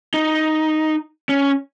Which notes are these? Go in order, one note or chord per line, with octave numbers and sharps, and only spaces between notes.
D#4
C#4